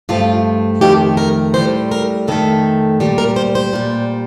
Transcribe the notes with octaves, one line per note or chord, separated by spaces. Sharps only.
G2 F3 A3 F4
F2 D#3 A3 G4
A#4
A2 G3 C5
A#4
F2 D#3 A3 A4
A#2 G3 G4
A#4
C5
C5
A#2 G3